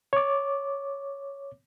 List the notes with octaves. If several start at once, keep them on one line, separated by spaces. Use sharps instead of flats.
C#5 D6